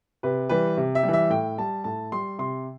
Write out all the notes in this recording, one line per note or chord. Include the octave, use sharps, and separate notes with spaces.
C3 B4
E3 G3 B4
C3
E5
G3
E3 E5
A2 G5
G3 A5
A2 A5
G3 C6
C3 C6